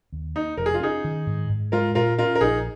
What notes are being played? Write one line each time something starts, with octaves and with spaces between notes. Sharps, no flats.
D#2
A#3 D#4
F1 A#4
G#4
F4
C#4 D#4 G#4
D#3
G#2
G#2
G#3 F4 A#4
A#2 F4 A#4
C#4 F4 A#4
A#4
A#1 D#4 G#4